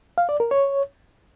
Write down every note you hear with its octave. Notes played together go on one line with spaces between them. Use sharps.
F5
D5
A#4
C#5